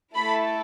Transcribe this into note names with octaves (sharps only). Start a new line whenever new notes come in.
A3 E4 A4 B5